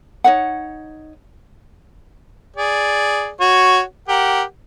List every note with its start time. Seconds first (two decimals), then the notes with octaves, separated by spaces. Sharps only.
0.24 D#4 C#5 F#5
2.56 G#4 D5
3.40 F#4 C#5
4.08 G4 A#4 F#5